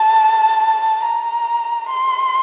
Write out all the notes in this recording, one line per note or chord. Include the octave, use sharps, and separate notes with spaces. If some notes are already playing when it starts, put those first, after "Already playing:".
Already playing: A5
A#5
C6